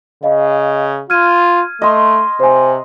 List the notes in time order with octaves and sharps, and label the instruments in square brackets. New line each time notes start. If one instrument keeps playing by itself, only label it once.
[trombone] C#3 [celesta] D#5 F5
[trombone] F4 [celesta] F6 G#6 D#7
[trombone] A3 [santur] D#5 C6
[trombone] C3 [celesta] C5 G#5